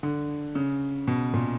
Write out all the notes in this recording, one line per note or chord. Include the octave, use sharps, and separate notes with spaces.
D3
C#3
B2
A#2